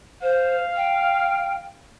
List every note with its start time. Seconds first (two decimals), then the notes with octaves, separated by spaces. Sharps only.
0.22 C5 F5
0.77 G5